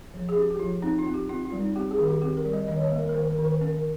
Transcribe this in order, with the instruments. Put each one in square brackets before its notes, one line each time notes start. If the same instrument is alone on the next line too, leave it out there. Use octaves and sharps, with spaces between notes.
[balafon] F3
G#4
C#4 G4
G4
F3 F4
C4 D#4
F4
C4
G4
C4 F4
F4
G3
D#4
C4 G4
G#4
D#3
G4
C4 G4
A#4
G3
D#5
D#3 D#5
C#5
D#5
A#3
A#4
A#4
D#3 C5
A#4
D#3
C5
C#4 A#4
A#4